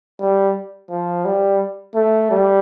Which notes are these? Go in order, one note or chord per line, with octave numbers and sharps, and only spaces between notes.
G3
F3
G3
A3
G3